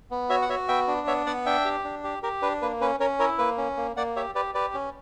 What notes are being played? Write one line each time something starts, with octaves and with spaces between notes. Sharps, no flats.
B3
F#4 C#5 E5
F#5
F#4 C#5 E5
B3 E5 G5
D4
B3 C#5 E5
B3 D5 F#5
D4 E5 G5
G4
D4
G4
G4 A#4
D4 B4
A#3 B4
C#4 B4
C#4 A#4 C#5
E4 A#4 C#5
A#3 B4
C#4
A#3
A#3 D5 F#5
G4 C#5 E5
G4 B4 D5
G4 B4 D5
C#4